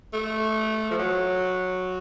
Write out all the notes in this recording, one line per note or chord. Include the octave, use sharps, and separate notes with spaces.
A3
F3
F#3